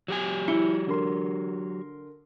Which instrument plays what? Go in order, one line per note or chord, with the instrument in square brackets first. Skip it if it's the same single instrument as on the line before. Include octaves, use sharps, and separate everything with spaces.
[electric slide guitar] F#3 G4 G#5
[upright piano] E4 C#7 G7
D3 A#4 C6